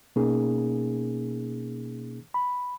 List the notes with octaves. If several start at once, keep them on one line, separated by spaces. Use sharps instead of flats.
B2 A#3 C#4 D#4 G#4
B5